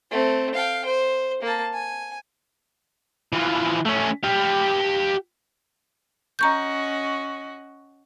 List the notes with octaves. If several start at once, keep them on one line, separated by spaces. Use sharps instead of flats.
A3 C4
F5 G5
C5
A#3 A5
G#5
E3 F3
A3 C#4
G4 F5
C#4 F#4 D#5 A#5 C#6 G6